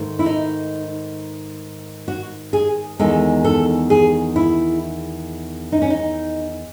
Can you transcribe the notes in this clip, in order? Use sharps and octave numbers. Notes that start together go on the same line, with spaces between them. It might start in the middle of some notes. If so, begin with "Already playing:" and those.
Already playing: G#2 D#3 A3
E4
D#4
F#4
G#4
E2 D#3 G#3 A4
A4
G#4
E4
D#4
C#4
D#4